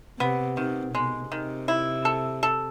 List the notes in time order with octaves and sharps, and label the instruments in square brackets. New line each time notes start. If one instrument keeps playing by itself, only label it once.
[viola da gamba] C3 [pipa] B3
[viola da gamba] C3 [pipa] D#3
[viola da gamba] B2 [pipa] G#3
[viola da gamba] C3 [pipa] D#3
[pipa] E4
A4
A4